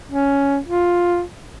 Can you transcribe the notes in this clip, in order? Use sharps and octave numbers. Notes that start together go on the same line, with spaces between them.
C#4
F4